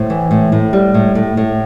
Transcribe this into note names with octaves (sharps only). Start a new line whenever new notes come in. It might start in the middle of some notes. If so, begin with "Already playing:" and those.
Already playing: A2 C5
E3
A2
A2
G3
A2
A2
A2